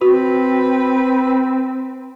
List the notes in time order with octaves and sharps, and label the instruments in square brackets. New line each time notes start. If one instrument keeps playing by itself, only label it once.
[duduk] C4 [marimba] F#4 [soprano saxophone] B4